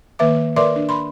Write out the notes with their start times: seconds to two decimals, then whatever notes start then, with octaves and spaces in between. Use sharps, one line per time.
0.19 D#3 A#3 B4 E5 D6
0.56 A#4 B4 D5 E5 C6 D6
0.76 D4
0.89 B5 C6